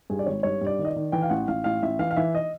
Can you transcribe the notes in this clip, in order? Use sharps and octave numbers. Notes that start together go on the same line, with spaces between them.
G2 G#4
D5
G#1 C#5
G2 C#5
G2
D5
D#3
D#5
D5
D#3
E3 G5
F5
A1 F#5
A1 F5
A1 F5
A1 E5
E3 F5
F5
E3 E5
D#5